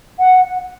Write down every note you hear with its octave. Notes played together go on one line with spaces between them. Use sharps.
F#5